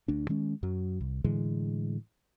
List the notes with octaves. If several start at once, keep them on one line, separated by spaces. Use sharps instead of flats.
D2 D4
D#3 G#3 C#4
F#2 F#3
C2
A2 D3 E3 G#3